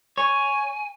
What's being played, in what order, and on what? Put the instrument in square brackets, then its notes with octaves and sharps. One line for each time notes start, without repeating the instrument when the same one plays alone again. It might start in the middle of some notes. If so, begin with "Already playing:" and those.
[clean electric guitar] C#5 [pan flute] G#5